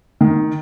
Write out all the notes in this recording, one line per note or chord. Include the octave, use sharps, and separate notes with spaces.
D#3